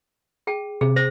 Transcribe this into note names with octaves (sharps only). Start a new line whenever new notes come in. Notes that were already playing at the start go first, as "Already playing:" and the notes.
G#4 G5 A5
C3 G#4
C5 A#6